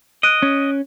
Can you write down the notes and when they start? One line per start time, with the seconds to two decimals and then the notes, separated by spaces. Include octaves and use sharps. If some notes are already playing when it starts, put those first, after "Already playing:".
0.23 D#5 F#6 D7 D#7
0.42 C#4